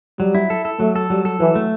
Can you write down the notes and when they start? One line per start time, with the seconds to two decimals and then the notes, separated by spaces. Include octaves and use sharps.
0.20 F#3 G3
0.35 E4
0.50 A4
0.65 A4
0.79 F#3 A3
0.96 A4
1.10 F#3 G3
1.25 A4
1.40 E3 F#3
1.55 A3